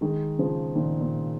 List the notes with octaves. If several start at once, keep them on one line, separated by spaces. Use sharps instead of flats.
D#3 G#3
C#3 F3
A#2 D#3
A#2